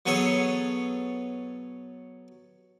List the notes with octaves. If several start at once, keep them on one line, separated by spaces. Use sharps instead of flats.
F#3 B3 G#4 A4 C#5